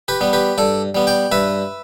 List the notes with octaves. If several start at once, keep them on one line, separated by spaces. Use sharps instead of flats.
G4 B4
G3 B3
G4 B4
G2 A4 D5
G3 B3
D5 G5
G2 B4 E5